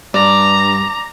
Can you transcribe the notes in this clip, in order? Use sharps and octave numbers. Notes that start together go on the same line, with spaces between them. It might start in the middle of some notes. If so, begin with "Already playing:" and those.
G2 D5 A#5